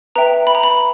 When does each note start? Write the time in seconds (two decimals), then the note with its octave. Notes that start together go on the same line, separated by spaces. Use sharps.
0.16 B4 E5 G5 A#5
0.47 B5
0.55 A#5
0.63 B5